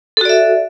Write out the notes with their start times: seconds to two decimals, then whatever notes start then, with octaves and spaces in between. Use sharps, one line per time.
0.17 A4
0.21 F#4
0.25 D5
0.29 E5